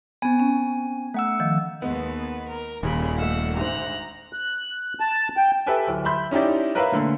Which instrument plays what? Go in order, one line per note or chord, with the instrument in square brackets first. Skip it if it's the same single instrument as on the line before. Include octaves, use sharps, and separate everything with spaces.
[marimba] B3 [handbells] C4 G#5
[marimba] C#4
[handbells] A3 F#5 E6
[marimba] D#3 F3
[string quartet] D#2 B4 [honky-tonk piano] G#3 B3
[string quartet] A#4
[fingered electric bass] D#1 [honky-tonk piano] D#2 [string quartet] C#3 B5
[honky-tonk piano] A3 F5 [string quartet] F#5 E6
[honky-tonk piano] D2 G#2 C5 [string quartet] A#5 F#6
[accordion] F#6
A5
G5
[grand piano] G4 A4 B4 E5 G5 G#5
D1
E5 B5 C6 G6
C#4 D#4 E4 G4 D5
A#4 B4 C#5 E5 F5 B5
A#2 D3 A3